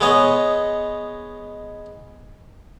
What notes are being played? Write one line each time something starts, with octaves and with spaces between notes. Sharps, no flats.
G#3 B3 C#5 D#5